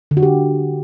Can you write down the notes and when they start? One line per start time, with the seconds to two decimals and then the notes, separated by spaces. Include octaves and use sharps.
0.11 D3
0.17 F#4
0.23 G4